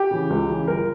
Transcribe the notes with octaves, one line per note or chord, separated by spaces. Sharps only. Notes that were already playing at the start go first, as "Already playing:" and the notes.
Already playing: G4
C#3 E3
C#2
C#3 E3
G1 A#4